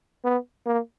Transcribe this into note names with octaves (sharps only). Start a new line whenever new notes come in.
B3
A#3